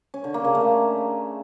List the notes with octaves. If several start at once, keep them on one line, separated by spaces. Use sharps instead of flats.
C#4
D3
A#3
C#3
A3